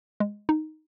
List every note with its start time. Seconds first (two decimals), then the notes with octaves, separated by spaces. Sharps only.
0.20 G#3
0.49 D#4